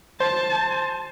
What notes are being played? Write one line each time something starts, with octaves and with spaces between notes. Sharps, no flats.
C5 A5